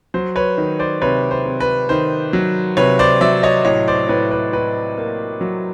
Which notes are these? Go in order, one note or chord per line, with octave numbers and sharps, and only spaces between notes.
F#3 C5
B4 C#5
D#3
C5 D5
C3 B4 C#5
C5
C3
B4
D#3 C5
F#3
C3 B4 C#5
C5 D5
F#3 D5 E5
C#5 D#5
A2 C#5 D#5
C5 D5
A2 B4 C#5
B4
A2 B4
A#3
F#3